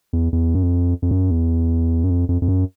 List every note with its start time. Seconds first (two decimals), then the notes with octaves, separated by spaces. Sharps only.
0.13 E2
0.33 E2
0.55 F#2
0.63 F2
1.02 F2
1.11 F#2
1.31 E2
2.04 F#2
2.10 F2
2.29 F2
2.42 F2
2.48 F#2